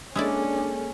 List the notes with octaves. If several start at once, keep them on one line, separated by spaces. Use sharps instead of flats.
G#3 A#3 C#4 D4 E4 G#4 A4 D5